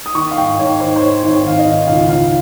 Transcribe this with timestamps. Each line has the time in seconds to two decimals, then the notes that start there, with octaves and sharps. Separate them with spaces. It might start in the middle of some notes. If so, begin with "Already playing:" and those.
0.06 D#6
0.15 D#3 C#6
0.31 F5
0.38 G#2 G5
0.58 G#2 C#5
0.80 D#3 C5
0.96 C5
1.01 D#3 C#5
1.22 G#1
1.30 C#5
1.44 G#1 F5
1.59 D#5
1.65 G#1
1.87 C#2 F5
2.08 C#2 F5